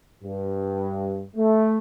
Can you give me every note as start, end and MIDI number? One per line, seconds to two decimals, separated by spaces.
0.23 1.22 43
1.36 1.78 57